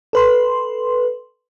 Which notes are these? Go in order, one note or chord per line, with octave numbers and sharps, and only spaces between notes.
A4 B4 C6